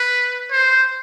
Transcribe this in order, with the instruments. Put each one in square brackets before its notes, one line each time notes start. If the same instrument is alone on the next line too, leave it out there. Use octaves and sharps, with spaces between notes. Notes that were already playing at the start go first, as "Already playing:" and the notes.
Already playing: [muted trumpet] B4
C5